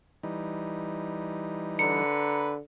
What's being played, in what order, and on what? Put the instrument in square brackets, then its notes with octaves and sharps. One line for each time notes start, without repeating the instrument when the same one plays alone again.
[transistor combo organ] E3 G3 D#4
[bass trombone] D3 [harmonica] B4 A#5 [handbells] C#7